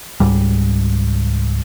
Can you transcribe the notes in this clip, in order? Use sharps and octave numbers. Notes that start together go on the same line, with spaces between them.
C#2 G#2 G3